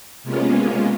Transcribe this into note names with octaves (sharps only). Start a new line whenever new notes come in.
C3 G#3 A#3 B3 C#4 F4